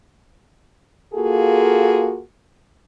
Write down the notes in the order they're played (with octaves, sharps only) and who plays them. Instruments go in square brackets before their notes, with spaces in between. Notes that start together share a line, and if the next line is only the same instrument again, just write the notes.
[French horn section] A#3 F4 F#4 G#4 A4